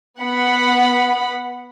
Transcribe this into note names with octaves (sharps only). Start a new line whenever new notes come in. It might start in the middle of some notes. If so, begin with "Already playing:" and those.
B3 F#5 B5